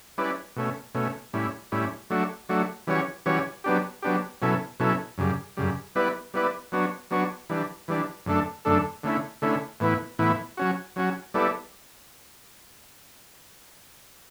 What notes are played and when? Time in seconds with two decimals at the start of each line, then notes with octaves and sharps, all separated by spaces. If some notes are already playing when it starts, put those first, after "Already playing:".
0.18 G3 C#4 E4 B4 D5
0.56 B2 A3 C#4
0.95 B2 A3 C#4
1.33 A2 G3 C#4 E4
1.72 A2 G3 C#4 E4
2.10 F#3 A3 D4 F#4
2.49 F#3 A3 D4 F#4
2.87 E3 G3 C#4 F#4 C#5
3.26 E3 G3 C#4 F#4 C#5
3.64 F#3 B3 D4 G4
4.02 F#3 B3 D4 G4
4.42 B2 F#3 C#4 E4 A4
4.80 B2 F#3 C#4 E4 A4
5.18 F#2 C#3 G3
5.57 F#2 C#3 G3
5.95 G3 B3 E4 B4 D5
6.34 G3 B3 E4 B4 D5
6.72 F#3 B3 D4 F#4 C#5
7.11 F#3 B3 D4 F#4 C#5
7.49 E3 G3 D4
7.88 E3 G3 D4
8.26 F#2 D3 A3 D4 A4
8.65 F#2 D3 A3 D4 A4
9.03 D3 A3 C#4 E4
9.42 D3 A3 C#4 E4
9.80 A2 E3 B3 E4
10.19 A2 E3 B3 E4
10.57 F#3 C#4 F#4
10.96 F#3 C#4 F#4
11.34 G3 B3 E4 A4 D5